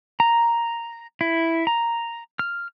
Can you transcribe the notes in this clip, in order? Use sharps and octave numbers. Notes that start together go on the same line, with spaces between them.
A#5
E4
A#5
F6